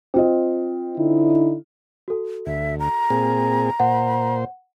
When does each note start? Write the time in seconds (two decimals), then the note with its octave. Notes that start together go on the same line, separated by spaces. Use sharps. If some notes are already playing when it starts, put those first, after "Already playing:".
0.14 C4 F4 D#5
0.97 D3 D#4 E4
2.08 F#4 A4
2.47 D2 E5
2.80 A#5
3.10 A#2 C4 G#4
3.80 A#2 C5 F#5